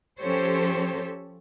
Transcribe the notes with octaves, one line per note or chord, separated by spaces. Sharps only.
F3 C#4 G4 A4 C5 C#5